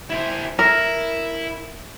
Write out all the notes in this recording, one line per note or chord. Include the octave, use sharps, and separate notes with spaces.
E4 C5
E4 A#4